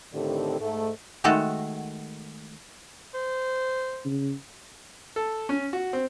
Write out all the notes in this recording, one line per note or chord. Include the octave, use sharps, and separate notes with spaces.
A2 D3 D#3 C4 G4 A4
G#2 A3
D#3 G#3 A3 F#4 A4
C5
C#3
A4
C#4
F#4
C4